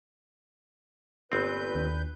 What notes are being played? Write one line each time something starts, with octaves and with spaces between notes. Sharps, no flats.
G1 A#2 C4 B4 G6
D#2 D4